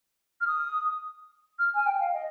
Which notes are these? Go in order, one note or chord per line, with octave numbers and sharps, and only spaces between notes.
F6
D#6
F6
G#5
G5
F5
D#5